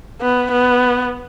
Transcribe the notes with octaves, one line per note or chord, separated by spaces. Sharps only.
B3
B3